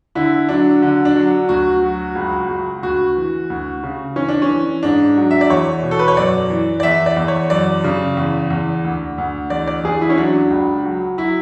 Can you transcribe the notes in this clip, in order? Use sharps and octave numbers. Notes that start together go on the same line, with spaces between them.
D3 E4
F#3 D4
D3
D4
F#3
D2 F#4
F#3
C#2
C#2
D2 F#4
E3
D2
C#3
E3 C#4
D4
C#4
E3
G#2 D4
F#3
E5
D5
E2 C#5
B2
A4
B4
C#5
F#2 D5
E3
D5
E2 E5
D5
E2
C#5
F#2 D5
C#3
E2
E2
D2
D2
E2 D5
D5
E2 G#4
E4
C#4
F#3 D4
C#2
F#3
F#3 E4